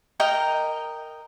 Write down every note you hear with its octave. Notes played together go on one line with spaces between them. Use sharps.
A#4 D#5 G5 A#5